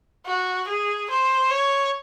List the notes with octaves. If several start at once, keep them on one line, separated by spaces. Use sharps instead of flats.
F#4
G#4
C5
C#5